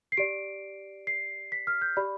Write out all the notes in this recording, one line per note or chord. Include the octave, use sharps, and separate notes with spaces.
C7
G4 D5 D7
C7
B6
F6
G6
G4 D5 B5